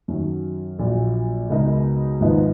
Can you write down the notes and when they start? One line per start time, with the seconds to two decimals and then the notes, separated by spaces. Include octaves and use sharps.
0.08 F#2 D#3 F#3
0.79 A#1 A#2 F#3
1.50 C#2 B2 G#3 D#4 A#4
2.20 G#1 G#2 F3 B3 D#4